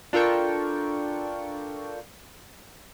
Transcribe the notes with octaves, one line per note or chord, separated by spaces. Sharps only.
D4 F4 A4 A#4 G5 C#6